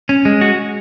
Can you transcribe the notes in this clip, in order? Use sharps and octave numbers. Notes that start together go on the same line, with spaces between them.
C#4
G#3
F#4